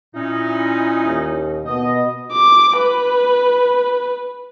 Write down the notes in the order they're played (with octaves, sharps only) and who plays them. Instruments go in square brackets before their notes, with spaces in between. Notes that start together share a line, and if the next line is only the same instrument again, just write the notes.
[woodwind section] A#2 C#4 D#4 [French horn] E4
[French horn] D#2
[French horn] B2 [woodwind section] D#5
[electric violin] D6
B4